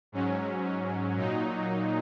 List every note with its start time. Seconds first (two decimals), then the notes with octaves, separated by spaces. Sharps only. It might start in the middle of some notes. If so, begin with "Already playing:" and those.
0.12 G#2 F#3 C#4
1.15 A#2 F#3 D#4